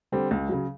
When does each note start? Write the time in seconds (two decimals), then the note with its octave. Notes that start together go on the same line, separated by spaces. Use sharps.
0.12 D3 G3 C4
0.31 C#2
0.49 C#3 F#3